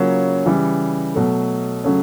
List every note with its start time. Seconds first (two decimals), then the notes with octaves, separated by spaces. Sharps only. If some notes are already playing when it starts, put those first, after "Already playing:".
Already playing: C#3 F#3 A#3 C#4 F4
0.46 C#3 E3 G3
1.15 B2 F#3 A3
1.84 C#3 F#3 A3 C#4